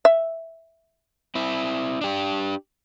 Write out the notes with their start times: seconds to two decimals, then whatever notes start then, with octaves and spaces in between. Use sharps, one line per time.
0.05 E5
1.35 C4 E4
2.01 D4 G4